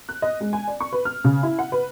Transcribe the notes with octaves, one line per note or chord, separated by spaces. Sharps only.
F#6
D#5
G#3
G#5
D5
C#6
B4
F6
C#3
E4
F#5
B4